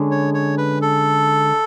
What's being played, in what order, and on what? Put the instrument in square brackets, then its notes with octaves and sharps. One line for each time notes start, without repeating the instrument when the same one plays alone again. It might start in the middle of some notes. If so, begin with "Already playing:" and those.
Already playing: [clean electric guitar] D3 G#3 C#4
[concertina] C#5
C#5
B4
A4